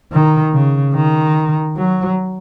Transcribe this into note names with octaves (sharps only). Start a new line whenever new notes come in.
D#3
C#3
D#3
F#3